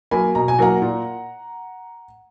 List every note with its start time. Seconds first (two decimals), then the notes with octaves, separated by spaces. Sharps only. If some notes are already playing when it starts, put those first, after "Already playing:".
0.11 F#3 A#3 G#5 B5
0.35 B2 A#5
0.48 G#5
0.58 F#3 A#3 F#5 A#5
0.82 A#2